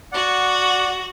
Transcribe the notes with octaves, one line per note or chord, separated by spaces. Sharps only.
F#4 D5 F#5